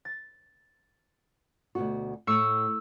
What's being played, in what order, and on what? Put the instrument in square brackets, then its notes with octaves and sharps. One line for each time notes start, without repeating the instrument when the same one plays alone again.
[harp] A6
[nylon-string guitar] D2 B2 F#4
[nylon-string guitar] A2 [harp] C#6 E6 C#7